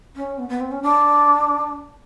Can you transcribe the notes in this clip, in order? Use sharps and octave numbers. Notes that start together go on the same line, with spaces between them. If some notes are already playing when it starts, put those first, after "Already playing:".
C#4
B3
B3
C4
C#4
D4